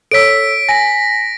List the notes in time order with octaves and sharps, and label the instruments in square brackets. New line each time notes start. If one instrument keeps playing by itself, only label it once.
[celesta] A4 C#5 E6 [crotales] B6 D7
[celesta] G#5 [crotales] A#6 D7